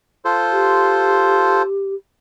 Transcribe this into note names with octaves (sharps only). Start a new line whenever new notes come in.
F4 A4 C5
G4